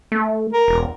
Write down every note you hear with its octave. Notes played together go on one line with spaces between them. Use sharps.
A3
A#4
E1